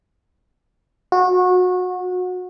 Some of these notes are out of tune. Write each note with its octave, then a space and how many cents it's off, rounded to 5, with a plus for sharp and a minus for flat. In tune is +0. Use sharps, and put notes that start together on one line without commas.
F#4 -25